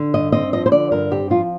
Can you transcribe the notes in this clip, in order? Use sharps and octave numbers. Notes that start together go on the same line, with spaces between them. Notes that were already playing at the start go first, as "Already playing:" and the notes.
Already playing: D3
G2 D#5
C4 D#5
F3 D#5
C5
D3 D5
G2 A#4
C4 G4
F3 F4